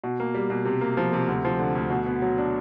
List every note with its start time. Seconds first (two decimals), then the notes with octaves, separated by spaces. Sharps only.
0.04 B2
0.20 A#3
0.34 G3
0.50 B2
0.65 C3
0.81 A#3
0.97 F3
1.13 C3
1.28 D2
1.45 F3
1.59 D3
1.75 D2
1.90 B2
2.06 B3
2.22 F#3
2.38 D4